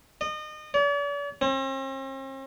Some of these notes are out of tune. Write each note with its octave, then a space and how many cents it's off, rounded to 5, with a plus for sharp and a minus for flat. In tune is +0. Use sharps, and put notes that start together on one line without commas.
D#5 -30
D5 -45
C4 +45